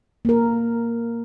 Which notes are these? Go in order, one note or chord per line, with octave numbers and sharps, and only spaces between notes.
A#3 A#4